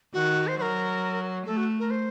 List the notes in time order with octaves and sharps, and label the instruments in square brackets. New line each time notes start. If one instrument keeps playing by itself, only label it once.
[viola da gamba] D#3 [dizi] F#4
[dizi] C5
[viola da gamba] F#3 [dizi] A#4 C5
[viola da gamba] A3 [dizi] A4
[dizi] F#4
A#4
C5